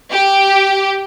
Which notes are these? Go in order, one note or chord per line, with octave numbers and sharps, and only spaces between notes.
G4